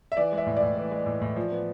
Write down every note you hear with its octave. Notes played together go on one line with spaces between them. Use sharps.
E5
E3 D5
G#3
E5
A2
D5
A2
E3
G#3
A2
A2
F3
B3